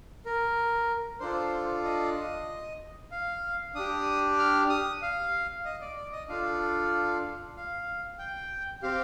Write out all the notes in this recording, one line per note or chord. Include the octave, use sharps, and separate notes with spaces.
A#4
D4 F4 A4 C5
D#5
F5
D4 G4 D#6
F6
D#6
F5
D#5
D5
D5
D#5
D4 F4 A4 F5
F5
G5
C4 G4 F5